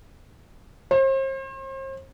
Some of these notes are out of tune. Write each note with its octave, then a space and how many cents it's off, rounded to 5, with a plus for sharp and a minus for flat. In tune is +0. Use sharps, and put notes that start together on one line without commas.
C5 +40